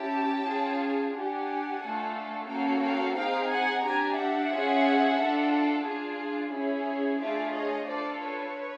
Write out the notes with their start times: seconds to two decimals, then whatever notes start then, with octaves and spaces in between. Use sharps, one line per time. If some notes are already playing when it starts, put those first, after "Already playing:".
Already playing: C#4 E4 G4 G5 A5
0.45 C#4 F4 G#4
1.12 D4 G4 F#5 G#5
1.80 A3 D4 F4 A4
2.47 A#3 C#4 F#4 A4 F5 G5
2.80 F5 G5
3.14 C4 D#4 G#4 F5 G5
3.49 F#5 G#5
3.82 D4 G4 G#5 A#5
4.15 E5 F#5
4.50 C#4 F4 G#4
5.17 D4 F4 A4
5.84 D4 F4 G#4
6.51 C#4 E4 G#4
7.19 A3 D4 F4 G#4 D5 E5
7.52 C#5 D#5
7.85 D4 F4 A4 C5 D5
8.20 B4 C#5